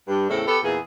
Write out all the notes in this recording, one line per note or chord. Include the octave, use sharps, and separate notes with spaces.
G2
E2 A2 C#3 C4 E4 A4
B3 G4 A4
E2 A#2 E3 G#4